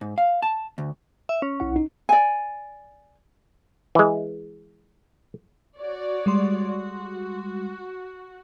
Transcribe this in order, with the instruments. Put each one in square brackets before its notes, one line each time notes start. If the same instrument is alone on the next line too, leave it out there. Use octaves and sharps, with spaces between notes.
[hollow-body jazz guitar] G#2
F5
A5
D2
[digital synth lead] E5
C#4
[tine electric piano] B1 E4 F#5
D#4
[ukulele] D5 G#5
[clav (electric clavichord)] E3 G#3
[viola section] F#4 C#5 D5
[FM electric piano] G3 G#3 C6
[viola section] F#4